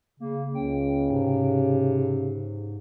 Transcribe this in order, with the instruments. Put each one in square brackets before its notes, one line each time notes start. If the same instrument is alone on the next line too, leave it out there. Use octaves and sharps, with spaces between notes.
[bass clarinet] C#3 [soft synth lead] A#3
[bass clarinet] C#2 [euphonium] C#3 [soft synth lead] G5
[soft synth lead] G#2 [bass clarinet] C3